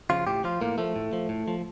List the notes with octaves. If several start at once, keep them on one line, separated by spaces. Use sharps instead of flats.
C#3 F3 F4
A2 G4
F3 F4
A2 A#3
F3 A3
A2
F3
A2
F3